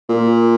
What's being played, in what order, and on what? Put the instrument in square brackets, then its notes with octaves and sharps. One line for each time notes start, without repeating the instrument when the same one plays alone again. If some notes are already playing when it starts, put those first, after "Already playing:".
[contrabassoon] A#2